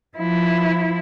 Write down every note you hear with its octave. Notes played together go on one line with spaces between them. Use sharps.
F3 E4